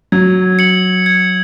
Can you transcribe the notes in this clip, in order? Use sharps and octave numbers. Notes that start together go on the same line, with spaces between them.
F#3 G#6
C#7 F#7
G#6